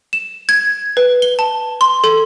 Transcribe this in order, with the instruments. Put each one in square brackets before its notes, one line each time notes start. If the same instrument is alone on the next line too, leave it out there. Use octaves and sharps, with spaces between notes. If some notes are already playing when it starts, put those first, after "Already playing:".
[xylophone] E7
G#6
B4
G7
A5
C6
A4